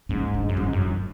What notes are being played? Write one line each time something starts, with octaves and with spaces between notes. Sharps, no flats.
G#2 C#4
D4
F#2
G#2 C#4
F#2
D4